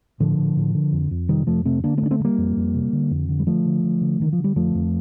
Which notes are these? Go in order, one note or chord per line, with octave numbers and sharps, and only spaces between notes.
A2 D3 F3
A2
A2
D3
F2
F2
C3 D#3 G3
F2 F3 A3
C3 A3 C4
D3 A#3 D4
G2 A3 C4
D4
A3 C4
G2
G3 A#3
F2
F2
C3
D3
F2
D3
G3
D3 F3 A3
D3
D3
D3
D3 D#3
F3
D3
G3
F2 F3 A3
F2